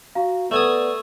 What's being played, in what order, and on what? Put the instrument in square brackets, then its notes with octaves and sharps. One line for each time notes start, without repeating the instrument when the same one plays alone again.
[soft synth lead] F#4 [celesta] F5 A#5
[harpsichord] A3 G#5 D#6 [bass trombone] B3 [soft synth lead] D5 [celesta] E7